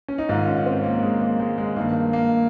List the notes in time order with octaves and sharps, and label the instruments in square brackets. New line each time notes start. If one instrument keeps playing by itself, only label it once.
[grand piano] C#4
D#4
G#2 D#3 F4
C#4
C4
A#3
G#3
A#3
G#3
G#3
G2 D#3 A#3
A#3